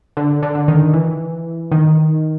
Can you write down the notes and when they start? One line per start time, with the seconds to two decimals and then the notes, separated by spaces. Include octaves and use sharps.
0.17 D3
0.43 D3
0.55 D3
0.68 D#3
0.94 E3
1.71 D#3